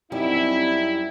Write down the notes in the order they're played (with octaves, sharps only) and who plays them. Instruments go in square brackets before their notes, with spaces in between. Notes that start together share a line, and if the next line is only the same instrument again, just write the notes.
[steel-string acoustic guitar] F#2 G3 G4 [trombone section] C4 D#4 [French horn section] E4